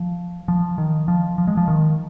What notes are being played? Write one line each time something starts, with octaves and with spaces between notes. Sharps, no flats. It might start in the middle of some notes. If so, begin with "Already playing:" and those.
Already playing: F3
F3
D#3
F3
F3
G#3
F3
D#3